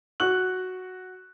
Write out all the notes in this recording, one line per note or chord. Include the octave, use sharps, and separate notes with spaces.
F#4 C#6 F#6 F#7